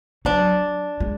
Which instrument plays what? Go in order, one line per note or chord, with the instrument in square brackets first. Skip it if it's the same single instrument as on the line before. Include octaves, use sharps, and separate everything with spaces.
[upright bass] F#3 [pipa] D4
[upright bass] G#3